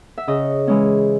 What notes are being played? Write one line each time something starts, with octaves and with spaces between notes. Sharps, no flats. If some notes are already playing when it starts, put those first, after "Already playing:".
E5
C#3 D#5
E3 G#3 C#4